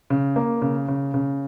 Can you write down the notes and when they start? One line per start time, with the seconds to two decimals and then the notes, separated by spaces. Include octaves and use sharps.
0.10 C#3
0.36 A#3
0.62 C#3
0.88 C#3
1.14 C#3